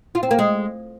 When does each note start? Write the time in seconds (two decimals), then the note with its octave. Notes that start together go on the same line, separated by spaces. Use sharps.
0.15 F4
0.23 C4
0.31 A#3
0.39 G#3